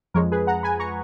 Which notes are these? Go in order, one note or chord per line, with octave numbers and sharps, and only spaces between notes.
F2 F3 G#3 A#4 C#5
G#4 B4
F#5 A#5
G#5 B5
A#5 C#6